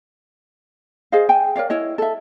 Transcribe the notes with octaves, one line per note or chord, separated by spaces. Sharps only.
G#4 C5 D#5 F5
G5 G#5
A#4 C#5 D5 F5
E4 C#5 D#5
A4 E5